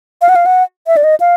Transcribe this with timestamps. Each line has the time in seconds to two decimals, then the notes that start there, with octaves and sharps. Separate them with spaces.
0.22 F5
0.29 F#5
0.36 F5
0.46 F#5
0.87 E5
0.97 D5
1.04 D#5
1.20 F5